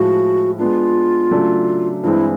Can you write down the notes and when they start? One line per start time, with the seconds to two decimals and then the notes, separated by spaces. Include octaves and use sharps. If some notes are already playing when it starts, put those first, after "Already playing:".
Already playing: A2 F3 G#3 F#4
0.59 G#3 B3 D4 F4
1.31 C#3 F#3 A3 D4
2.03 G2 E3 G#3 C4 E4 F4